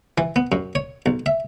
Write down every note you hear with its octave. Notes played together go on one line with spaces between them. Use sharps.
E3
B3
F#2
C#5
B1
E5